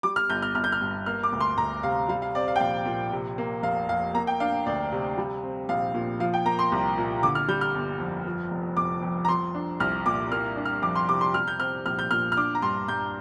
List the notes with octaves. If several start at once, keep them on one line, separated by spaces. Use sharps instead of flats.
G3 D6
F6
G1 G6
F6
G1 F6
G6
F6
G2
A#3 F6
D6
D2
C6
D2 A#5
C3 F5
G3 F5
F5
C4 D5
F5
G5
A#1 F5
A#2
C3
A#3
F1 F5
F2 F5
A#3 A#5
G5
D4 F5
D2 D5
C3
G3
C4
A#1 F5
A#2
F3 F5
G5
A#3 A#5
C6
C2
A#2
D3 D6
F6
G3 G6
F6
G1
F2
F3
F1
F1 D6
F2
A#5
F3 C6
D4
C2 F6
A#2 D6
A#3 F6
D4
F6
F2 D6
C6
C3 D6
C6
G3 F6
G6
C4 F6
A#1 F6
G6
A#2 F6
F6
D4 D6
A#5
G2 C6
G2 G6